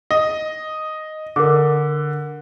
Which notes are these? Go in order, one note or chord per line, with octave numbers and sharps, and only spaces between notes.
D#5
D3 A#4 D6